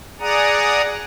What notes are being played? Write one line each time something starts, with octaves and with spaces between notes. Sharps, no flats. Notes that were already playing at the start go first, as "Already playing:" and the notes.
G#4 D5 F#5 A#5 D#6